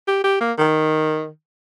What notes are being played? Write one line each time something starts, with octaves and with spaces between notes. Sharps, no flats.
G4
G4
A#3
D#3